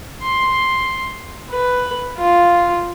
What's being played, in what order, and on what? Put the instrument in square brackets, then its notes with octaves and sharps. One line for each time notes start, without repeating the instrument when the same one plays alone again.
[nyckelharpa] C6
B4
F4